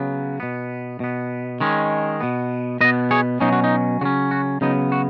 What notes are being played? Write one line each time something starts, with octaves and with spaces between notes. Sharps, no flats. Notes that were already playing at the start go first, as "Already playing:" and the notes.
Already playing: C#3 F#3 B3
B2 B3
B2 B3
D#3 G#3 C#4
B2 B3
B2 B3 B4 D#5
G#4 C#5
B2 F#3 C#4 D#4
F#4
D#4
C#3 F#3 C#4 F#4
F#4
C#3 F#3 B3 D#4
F#4